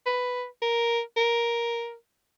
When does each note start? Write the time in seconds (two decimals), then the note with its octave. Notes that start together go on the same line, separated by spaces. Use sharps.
0.06 B4
0.62 A#4
1.16 A#4